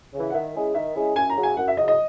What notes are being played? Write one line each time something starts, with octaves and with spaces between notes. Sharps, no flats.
C#3 E3
F#5
D#3 E5
G#3 C#4 E4 G#4
D#3 E5
G#3 C#4 E4 G#4
F#2 G#5
A#5
C#3 F#3
G#5
F#2 F#5
E5
C#3 F#3 D#5
D#5